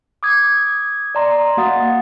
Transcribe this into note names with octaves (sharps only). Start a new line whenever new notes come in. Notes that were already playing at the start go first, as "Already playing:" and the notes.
D6 D#6 G#6
D5 D#5 A#5 C6 A#6
A#3 F#4 F5 F#5 D#6 A6